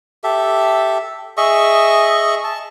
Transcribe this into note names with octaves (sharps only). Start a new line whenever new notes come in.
G4 A4 E5
G#4 D#5 E5 C#6
A5